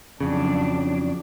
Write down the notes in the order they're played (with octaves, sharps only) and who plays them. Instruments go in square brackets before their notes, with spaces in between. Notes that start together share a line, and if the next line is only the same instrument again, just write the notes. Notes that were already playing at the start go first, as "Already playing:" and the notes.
[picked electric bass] F2 C#3 [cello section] F#3 D4